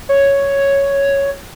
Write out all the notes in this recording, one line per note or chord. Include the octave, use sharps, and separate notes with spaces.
C#5